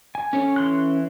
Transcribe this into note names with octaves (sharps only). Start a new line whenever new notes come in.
G#5
C#4 A4 C#5
E3 C6 F#6